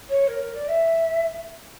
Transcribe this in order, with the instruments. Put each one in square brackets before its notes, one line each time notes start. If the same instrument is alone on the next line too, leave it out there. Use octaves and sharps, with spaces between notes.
[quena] C#5
A#4
A#4
D5
E5